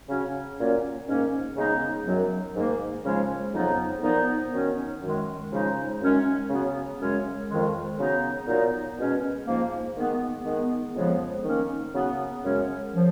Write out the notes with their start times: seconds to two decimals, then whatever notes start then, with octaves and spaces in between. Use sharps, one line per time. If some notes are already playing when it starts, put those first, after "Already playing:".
0.08 C#3 F#3 C#4
0.57 A#2 F#3 A#3 C#4
1.06 G#2 D#3 A#3 C#4
1.56 C#3 G#3 B3 D#4
2.06 F#2 D#3 F#3
2.55 G#2 D#3 A#3
3.04 C#3 F3 G#3 C#4
3.54 F2 C#3 F#3 B3 D#4
4.03 A#2 F3 B3 D#4
4.53 D#3 F#3 C#4
5.02 F#2 D#3 G#3
5.51 C#3 F3 G#3 D#4
6.00 F#2 D#3 G#3 C#4
6.50 C#3 F#3 B3
7.00 F#2 C#3 G#3 C#4
7.49 F2 D#3 G#3
7.98 C#3 F#3 B3 D#4
8.47 A#2 F#3 B3 D#4
8.98 B2 G#3 C#4
9.46 G#2 F3 A#3
9.95 D#3 G#3 B3
10.45 D#3 G#3 B3
10.95 F2 C#3 F3 G#3 B3
11.44 D#3 A#3 C#4
11.93 C#3 F#3 B3
12.42 F#2 C#3 G#3 C#4
12.93 C#3 F3